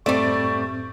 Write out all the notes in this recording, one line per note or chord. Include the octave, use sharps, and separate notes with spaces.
F#2 A2 G3 A3 C4 D5 C#6